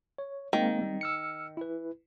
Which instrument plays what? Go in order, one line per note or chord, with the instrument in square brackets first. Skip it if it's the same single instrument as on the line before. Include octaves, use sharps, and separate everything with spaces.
[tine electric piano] C#5
[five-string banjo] D#3 [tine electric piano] G#3 A#3 C4
[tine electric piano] G3 C4
E6 F6 C#7
E4 B4